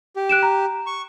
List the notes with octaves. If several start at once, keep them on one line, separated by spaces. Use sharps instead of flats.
G4
F#6 D7 E7
A#5
C#6